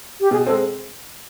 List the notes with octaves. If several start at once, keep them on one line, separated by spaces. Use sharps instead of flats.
G4
B2 G#4
G#3 C4 A4